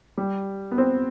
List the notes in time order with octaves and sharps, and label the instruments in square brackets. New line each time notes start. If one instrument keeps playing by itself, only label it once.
[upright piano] G3
B3
C4